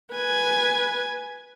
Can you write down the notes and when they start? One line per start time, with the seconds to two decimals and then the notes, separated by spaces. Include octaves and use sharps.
0.14 B4 G#5